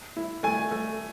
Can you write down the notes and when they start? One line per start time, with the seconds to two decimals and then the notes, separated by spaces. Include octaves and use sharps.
0.17 E4
0.43 A3 G#5
0.71 A3